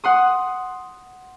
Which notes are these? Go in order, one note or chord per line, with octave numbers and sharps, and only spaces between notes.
F#5 C6 D#6